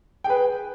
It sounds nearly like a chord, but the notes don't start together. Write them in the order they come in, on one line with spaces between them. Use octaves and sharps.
G5 G#4 B4